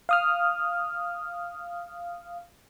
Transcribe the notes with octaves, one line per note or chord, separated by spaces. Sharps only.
F5 D#6 F6